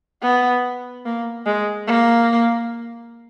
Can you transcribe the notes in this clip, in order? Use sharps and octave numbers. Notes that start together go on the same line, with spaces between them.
B3
A#3
G#3
A#3